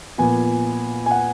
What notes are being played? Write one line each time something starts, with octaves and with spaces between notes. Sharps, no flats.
A#2 F3 B3 G#5
G#5
F#5